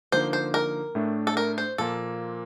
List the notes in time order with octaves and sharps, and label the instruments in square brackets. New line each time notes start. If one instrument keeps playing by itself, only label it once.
[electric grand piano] D3 F3 A#3 D#4 [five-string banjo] C5
[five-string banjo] C5
A#4
[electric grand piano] A2 A3 D4
[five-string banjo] A4
A#4
C5
[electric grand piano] A#2 F3 A#3 [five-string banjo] A4